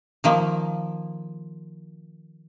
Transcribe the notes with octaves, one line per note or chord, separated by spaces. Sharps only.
D#3 F3 A#3